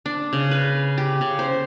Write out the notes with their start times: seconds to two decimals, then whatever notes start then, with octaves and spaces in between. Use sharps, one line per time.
0.06 D4
0.33 C#3
0.51 B4
0.98 G4
1.21 C#3
1.39 C5